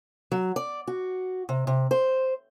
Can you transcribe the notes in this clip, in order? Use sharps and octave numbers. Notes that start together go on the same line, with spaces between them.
F#3
D5
F#4
C3
C3
C5